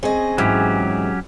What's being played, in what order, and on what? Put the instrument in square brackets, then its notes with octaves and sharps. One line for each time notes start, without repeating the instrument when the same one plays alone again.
[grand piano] C4 G#4 G#5 [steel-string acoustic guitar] C#4 D#5
[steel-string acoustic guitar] G#2 E3 [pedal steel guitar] F#3 C#4 G4